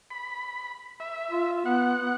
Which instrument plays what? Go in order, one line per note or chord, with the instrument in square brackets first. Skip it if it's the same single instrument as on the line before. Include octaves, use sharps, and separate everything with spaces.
[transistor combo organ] B5
E5
[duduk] F4
[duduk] B3 [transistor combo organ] F#5
[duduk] B3